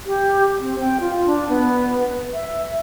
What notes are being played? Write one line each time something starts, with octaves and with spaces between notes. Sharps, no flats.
G4
C4
G5
F4
D4
B3
B4
E5